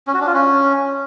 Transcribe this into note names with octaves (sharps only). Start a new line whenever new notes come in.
C#4
F#4
D4
F4
C#4